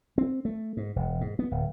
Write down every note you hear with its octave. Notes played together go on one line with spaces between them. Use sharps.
C4
A3
G#2
E1
G#2
B3
D1